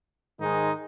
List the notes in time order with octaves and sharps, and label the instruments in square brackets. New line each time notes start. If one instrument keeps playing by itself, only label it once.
[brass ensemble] G#2 D#3 G#3 D#4